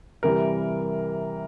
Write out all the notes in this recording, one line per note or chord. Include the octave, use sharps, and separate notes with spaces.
C3 E3 G3 A#4